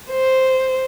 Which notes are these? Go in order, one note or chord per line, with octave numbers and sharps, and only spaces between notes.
C5